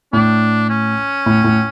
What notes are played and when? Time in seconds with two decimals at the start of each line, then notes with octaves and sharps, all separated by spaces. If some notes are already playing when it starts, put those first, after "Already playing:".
0.13 A2 D4
0.70 C#4
1.26 A2
1.44 A2